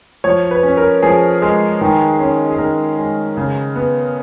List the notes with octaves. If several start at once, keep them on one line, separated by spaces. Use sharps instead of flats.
F3 C#5
B4
C#4
A#4
F3 G#4
G#3
D#3
C#4
G#4
D#3 A#4
G#3
C#3
B3